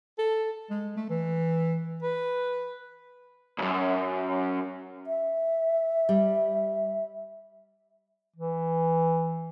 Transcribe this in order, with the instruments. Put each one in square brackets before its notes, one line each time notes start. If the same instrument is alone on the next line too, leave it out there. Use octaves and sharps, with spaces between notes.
[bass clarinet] A4
G#3
A3
E3
B4
[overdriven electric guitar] C#2 F#2
[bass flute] E5
[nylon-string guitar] G3
[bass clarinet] E3